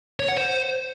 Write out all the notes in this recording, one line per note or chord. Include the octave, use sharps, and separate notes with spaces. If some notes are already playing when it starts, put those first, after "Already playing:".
C#5
F#5
C5